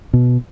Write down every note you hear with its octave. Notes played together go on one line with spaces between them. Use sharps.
B2